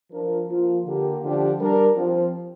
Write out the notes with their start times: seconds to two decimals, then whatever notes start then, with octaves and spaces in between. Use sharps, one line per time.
0.10 F3 D4 F4 A#4
0.47 F3 A#3 F4
0.85 D3 A#3 G4
1.22 D3 F3 D4 G4
1.58 G3 D4 A#4
1.95 F3 C4 F4 C5